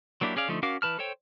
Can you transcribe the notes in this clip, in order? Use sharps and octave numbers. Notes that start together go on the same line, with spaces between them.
F#3 A#3 D4 E4 G4
C#4 G#4 D5 F5
D3 F3 A3 D#4
C#4 F#4 A#4 F5 D6
E3 B4 A5 F6
A4 C5 C#5 G5